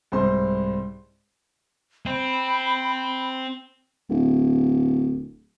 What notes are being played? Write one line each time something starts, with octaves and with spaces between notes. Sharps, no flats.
C2 G#2 C5 C6
C4 B5
D1